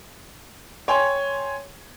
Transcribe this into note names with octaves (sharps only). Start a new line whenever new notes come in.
C#5 G5 G#5 C6